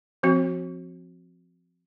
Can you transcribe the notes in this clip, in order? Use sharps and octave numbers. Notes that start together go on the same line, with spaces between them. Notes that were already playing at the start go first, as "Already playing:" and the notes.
F3 C4 F#4